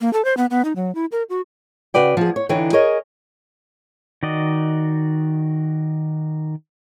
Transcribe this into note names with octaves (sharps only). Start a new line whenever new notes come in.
A#3
A4
C5
B3
B3
D#4
F#3
E4
A#4
F#4
C#3 F#4 B4 D5 G5
F3 G#4
C#5
D3 E3 D#4 C#5 G5
G#4 A#4 C#5 D#5
D#3 F#4 D5 D#5